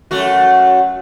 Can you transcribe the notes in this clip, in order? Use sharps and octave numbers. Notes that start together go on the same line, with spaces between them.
F#2 A3 F#4